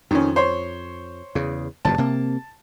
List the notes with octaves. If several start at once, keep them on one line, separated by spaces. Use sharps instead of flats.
F2 D#3 C#4
C5 C#5
E2 C#3
F#1 G2 A#2 A5
C3 A#3